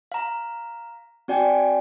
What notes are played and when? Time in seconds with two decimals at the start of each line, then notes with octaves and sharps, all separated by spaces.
0.12 F5 A#5
1.28 C4 F#4 D5 G5 G#5